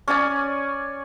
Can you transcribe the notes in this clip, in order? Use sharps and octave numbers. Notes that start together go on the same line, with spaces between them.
C#4 C#5 D5 G#5